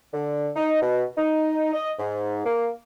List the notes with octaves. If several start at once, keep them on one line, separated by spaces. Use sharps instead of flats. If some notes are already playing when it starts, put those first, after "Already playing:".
D3
D#4
B2
D#4
D#5
G#2
A#3